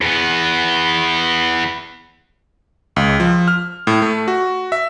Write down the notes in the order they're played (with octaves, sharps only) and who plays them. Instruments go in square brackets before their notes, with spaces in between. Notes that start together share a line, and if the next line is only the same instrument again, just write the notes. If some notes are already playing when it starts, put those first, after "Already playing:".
[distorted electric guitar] E2 B3
[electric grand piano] C#2
F3
F6
A2
A3
F#4
E5